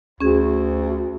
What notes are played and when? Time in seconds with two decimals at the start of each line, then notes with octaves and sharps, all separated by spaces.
0.21 D2 C#4 G#4